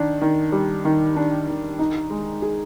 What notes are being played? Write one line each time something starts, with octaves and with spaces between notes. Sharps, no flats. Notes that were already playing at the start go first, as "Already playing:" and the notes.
Already playing: D#3 D4
D#3
G3
D#3
D4
D#3
D#4
G#3
G#4